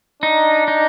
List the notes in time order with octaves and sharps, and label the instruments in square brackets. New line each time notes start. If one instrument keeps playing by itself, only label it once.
[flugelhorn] D4 [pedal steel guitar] D#4
[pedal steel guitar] D#4